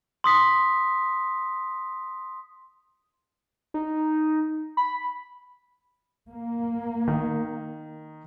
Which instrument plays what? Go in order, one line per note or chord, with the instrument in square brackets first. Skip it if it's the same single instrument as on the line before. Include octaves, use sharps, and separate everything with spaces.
[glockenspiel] C6 D#6 B6
[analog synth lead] D#4
B5
[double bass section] A#3
[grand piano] D#3